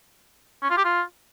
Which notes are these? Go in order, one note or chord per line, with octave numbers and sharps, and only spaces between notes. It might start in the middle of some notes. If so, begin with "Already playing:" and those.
C#4
F4
G4
F4